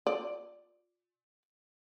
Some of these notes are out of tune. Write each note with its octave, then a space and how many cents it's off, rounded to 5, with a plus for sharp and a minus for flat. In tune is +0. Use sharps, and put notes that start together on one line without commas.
F4 +25 D5 +0